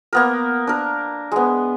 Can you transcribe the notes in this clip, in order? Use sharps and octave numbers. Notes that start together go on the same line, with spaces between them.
A#3 B3 A#4
D4 A#4
G#3 B3